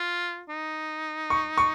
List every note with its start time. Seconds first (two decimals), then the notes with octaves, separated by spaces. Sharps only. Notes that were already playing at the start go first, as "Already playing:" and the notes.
Already playing: F4
0.50 D#4
1.30 C#6
1.58 C#6